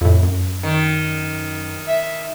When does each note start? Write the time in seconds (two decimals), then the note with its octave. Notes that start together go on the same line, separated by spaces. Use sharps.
0.01 F2 A2
0.23 F#2
0.63 D#3
1.88 E5